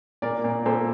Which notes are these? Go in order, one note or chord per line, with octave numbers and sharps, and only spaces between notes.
A#2 A#4 D5
A#2
A#2 A4 C5